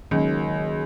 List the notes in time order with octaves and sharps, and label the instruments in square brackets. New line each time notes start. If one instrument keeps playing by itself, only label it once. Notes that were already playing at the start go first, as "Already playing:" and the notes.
[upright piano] C#2 [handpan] D#3 F#3 A#3